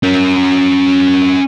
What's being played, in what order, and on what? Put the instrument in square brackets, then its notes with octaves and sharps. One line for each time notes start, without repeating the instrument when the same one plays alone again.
[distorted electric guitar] C#4 A#4